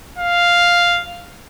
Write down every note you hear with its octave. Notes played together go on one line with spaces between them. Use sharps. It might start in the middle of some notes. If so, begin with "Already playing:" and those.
F5